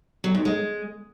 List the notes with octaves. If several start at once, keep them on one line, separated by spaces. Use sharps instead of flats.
F#3
G#2
G#3